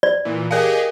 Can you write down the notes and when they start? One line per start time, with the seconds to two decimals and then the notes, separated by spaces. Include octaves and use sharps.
0.03 D5
0.25 A#2 E3
0.51 G4 G#4 A#4 D#5 F5